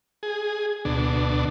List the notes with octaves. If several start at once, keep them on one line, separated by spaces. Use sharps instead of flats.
G#4
D2 B2 D4